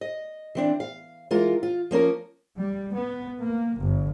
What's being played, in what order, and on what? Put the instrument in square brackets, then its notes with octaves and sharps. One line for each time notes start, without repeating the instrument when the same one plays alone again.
[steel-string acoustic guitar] D#5
E3 C4 D4
F5
E3 G#3 F4 A#4
F4
F3 A#3 C#4 A#4
[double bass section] G3
B3
A#3
G1